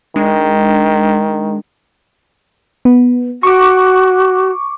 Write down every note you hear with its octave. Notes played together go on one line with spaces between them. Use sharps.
D#3 G#3 D4
B3
F#4 C#6 D6